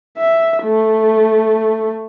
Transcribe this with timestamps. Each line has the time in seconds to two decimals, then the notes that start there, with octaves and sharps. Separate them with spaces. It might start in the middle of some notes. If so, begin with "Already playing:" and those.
0.18 E5
0.64 A3